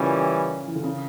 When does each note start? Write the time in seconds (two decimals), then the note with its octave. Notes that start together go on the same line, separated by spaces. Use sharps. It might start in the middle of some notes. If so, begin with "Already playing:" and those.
Already playing: A#2 C#3 E3 G3 C#4
0.67 E3
0.75 D3
0.84 C#3